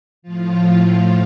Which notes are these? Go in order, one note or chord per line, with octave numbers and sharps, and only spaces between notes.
A2 F3 F4